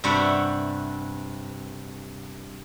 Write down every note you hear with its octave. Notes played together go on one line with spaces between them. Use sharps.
G2 C3 G3 F#4 E5 F#5